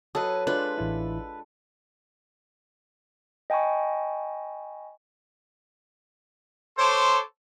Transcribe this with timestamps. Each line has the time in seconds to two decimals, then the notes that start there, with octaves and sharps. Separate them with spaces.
0.15 F#3 A4 B4 D#5
0.47 G#3 D4 F4 B4
0.78 A1 E4
3.50 D#5 G5 G#5 B5 C#6
6.79 A4 C5 C#5 C6 D6